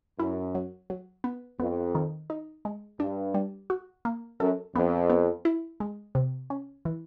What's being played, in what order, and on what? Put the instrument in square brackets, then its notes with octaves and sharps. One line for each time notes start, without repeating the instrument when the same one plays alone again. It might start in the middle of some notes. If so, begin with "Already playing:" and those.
[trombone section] F#2 [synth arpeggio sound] E4
[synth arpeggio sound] F#3
F#3
B3
[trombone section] F2 [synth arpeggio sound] B3
[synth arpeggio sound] D#3
D#4
G#3
[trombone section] G2 [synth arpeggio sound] D4
[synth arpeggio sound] G3
F#4
A#3
[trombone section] F#2 [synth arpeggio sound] A4
[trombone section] F2 [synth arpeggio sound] B3
[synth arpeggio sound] B3
E4
G#3
C3
C#4
E3